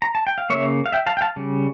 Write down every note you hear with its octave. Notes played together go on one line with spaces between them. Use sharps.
A#5
A5
G5
F5
C#3 F3 A#3 C#5 E5
F5
E5 G5
F5 A5
G5
F5 A5
C#3 G3